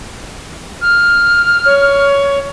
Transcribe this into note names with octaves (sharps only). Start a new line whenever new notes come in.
F6
C#5